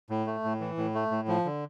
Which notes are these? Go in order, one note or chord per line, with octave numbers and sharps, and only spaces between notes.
A2
A3
A2
E3
A2
A3
A2
F3
D3